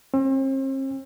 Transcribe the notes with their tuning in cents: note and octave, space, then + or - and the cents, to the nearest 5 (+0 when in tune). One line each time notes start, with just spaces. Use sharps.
C4 +45